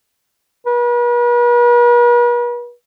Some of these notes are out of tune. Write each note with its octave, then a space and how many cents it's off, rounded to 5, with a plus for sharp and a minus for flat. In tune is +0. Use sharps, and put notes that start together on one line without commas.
B4 -45